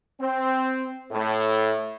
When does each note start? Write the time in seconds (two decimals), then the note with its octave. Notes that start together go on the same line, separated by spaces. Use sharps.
0.21 C4
1.11 A2